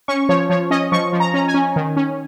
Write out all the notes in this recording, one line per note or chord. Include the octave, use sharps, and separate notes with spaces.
C#4 C#6
F3 C#5
F3 C#5
C#4 D#5
F3 C#6
F3
A#5
C#4 A#5
G#5
C#4
D#3
C#4